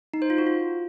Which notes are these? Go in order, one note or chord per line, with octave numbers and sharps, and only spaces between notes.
D#4
C5
F4
F#4
F4